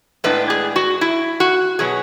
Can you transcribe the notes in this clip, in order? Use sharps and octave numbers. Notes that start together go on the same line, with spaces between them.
A2 G#3 B3 D4 B4
G#4
F#4
E4
F#4
B2 F#3 B3 G#4